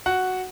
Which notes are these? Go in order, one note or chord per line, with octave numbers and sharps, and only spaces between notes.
F#4 F#5